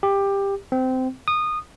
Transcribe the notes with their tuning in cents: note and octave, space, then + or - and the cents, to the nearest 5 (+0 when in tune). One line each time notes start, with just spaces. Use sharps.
G4 +15
C4 -20
D#6 -20